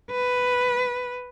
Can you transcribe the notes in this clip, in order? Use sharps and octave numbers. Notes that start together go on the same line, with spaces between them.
B4